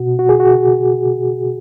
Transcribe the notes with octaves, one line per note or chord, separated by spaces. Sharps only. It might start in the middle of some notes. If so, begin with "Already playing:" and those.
Already playing: B2 F#4
F#4
G#4
F#4